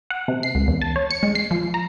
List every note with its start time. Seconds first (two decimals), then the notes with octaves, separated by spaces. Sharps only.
0.10 F#5
0.28 C3
0.43 C7
0.55 C#2
0.68 E2
0.82 A5
0.96 C#5
1.11 C#7
1.23 G#3
1.35 C7
1.51 F3
1.74 A#5